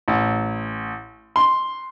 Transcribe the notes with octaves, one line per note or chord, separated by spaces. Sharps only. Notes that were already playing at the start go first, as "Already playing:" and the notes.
A1
C6